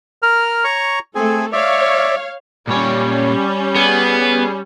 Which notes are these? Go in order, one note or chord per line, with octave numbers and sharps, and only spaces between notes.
A#4 F6
C#5 A#5 C#6
A3 C4 G#4 A4 G#5
C#5 D5 E5 F5
A#2 G3 C#4 C#5
B3 G#4